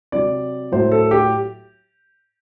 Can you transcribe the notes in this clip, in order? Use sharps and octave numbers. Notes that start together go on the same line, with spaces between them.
C3 F#3 D5
A2 F#3 C5
A4
G4